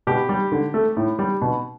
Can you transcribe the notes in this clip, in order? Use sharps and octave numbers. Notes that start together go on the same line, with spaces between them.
B2 G4
G3
D3
A3
A2
G3
B2